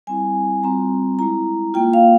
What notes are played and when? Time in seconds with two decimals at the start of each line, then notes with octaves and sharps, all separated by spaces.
0.07 G3 C4 E4 G#5
0.63 G3 C4 F4 A#5
1.19 G#3 E4 A#5
1.74 A#3 F4 G5
1.93 F5